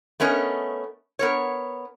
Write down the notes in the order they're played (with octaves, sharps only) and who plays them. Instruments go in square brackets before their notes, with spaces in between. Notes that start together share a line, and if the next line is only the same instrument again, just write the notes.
[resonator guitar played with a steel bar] A3 B3 C#4 A#4 D#5
B3 A#4 C#5